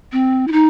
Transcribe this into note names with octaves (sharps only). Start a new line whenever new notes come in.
C4
E4
D#4